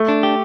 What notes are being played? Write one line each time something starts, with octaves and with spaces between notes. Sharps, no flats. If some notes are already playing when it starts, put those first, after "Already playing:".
Already playing: A3
D4
G4